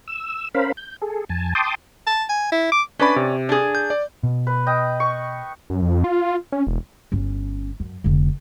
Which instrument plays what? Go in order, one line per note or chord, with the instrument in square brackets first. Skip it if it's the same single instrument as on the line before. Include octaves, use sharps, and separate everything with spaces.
[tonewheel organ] E6
C#4 A#4 C5 F5 B5
G6
G#4 A4
F2 G#5 A5
G5 A5 C6 D6 D#6
[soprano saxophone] A5
G#5
E4
D6
[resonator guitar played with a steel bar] C#4 D5 [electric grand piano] D4 B4 B5
[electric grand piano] C3
[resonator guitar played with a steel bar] D4 G#4
[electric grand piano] G6
D5
[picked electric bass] B2
[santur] B4
D#5 G5
C#6
[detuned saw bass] F#2
F2
F4
C#4
E1
[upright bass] G1 C#4
F#2
F1 D3